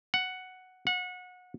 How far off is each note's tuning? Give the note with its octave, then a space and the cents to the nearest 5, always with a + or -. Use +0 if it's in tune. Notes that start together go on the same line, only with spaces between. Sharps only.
F#5 +5
F#5 -25